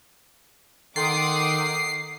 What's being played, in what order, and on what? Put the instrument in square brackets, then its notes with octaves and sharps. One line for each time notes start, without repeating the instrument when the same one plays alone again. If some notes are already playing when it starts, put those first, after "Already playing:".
[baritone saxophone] D#3 [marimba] A4 G5 C6 [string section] F#5 D6 D#6 [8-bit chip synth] C7